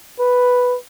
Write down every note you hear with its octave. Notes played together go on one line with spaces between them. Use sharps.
B4